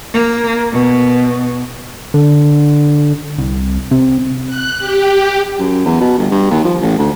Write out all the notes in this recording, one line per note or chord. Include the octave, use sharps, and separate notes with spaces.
A#3
B2
D3
C2
C3
F#6
G4
F#2
E2
B2
G1
G2
D#2
F3
A1
D2